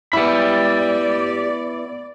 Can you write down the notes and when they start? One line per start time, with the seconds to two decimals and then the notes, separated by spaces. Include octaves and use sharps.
0.13 B3 E4 G4 D5 B5